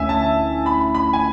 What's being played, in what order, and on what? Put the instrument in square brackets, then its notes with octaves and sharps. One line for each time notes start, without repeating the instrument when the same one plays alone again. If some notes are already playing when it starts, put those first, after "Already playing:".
Already playing: [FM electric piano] D2 D3 A3 C#4 E4 [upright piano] E5 G#5
[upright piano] A5
B5
B5
G#5